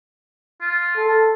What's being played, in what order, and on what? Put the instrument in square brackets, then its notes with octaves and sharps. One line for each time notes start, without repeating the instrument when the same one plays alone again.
[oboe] F4
[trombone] A4